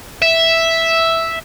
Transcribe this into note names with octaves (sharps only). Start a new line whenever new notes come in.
E5